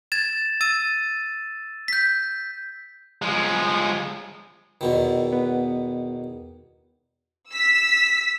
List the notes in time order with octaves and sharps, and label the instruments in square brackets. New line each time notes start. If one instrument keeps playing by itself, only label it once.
[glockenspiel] G#6 A6 E7
E6 A6 D#7
G6 B6
[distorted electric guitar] F3 G#3
[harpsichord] E2 B2 D#3
[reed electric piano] B3
[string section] E6 B6